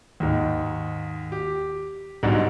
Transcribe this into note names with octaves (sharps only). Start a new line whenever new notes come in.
D#2 G#2
G4
B1 G#2 D3 F#3 G3